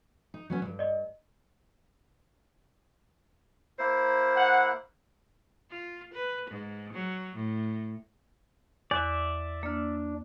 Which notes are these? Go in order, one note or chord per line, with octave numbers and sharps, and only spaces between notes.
D#4
F#3 B3 C#4
D2 G2
D5 D#5
A#3 E4 C5
F#5
F4
B4
G#2
F#3
A2
E2 D5 E5 F#6
A#3 D4 F6